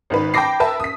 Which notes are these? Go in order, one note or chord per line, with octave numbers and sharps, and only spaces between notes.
G#1 D#3 B4
G5 A5 B5 D6 A#6 C7
A#4 B4 E5 A5 E6
D#6 B6